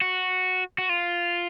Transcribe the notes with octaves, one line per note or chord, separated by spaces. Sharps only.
F#4
F#4
F4